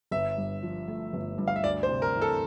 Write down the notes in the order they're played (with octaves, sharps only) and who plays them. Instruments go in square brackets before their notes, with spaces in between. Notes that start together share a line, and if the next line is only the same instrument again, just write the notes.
[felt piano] G1 [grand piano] E5
[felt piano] G2
F3
A3
G1
G2
[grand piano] F5
E5
[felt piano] D2 [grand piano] D5
[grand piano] C5
[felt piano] C3
[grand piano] A#4
[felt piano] E3
[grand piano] A4